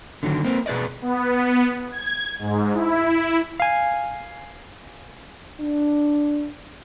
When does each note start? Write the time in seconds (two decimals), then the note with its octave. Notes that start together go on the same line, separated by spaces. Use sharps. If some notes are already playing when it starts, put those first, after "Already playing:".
0.23 D3 D#3 F#3
0.44 A#3 C4
0.66 B2 G#4 B4 D5 D#5
1.02 B3
1.92 G#6
2.39 G#2
2.74 E4
3.60 F5 G#5
5.60 D4